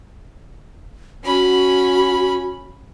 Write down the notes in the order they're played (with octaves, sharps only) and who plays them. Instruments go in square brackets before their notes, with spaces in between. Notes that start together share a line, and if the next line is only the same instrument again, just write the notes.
[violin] C#4 B5 [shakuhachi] F#4